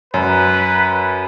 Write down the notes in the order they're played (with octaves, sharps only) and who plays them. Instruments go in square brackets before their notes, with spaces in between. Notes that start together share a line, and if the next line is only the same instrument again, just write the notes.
[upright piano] F#2 [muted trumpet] B4